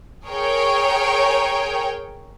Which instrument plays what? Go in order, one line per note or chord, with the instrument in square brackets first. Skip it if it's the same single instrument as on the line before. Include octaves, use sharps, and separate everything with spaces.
[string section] G#4 A#4 C#5 G5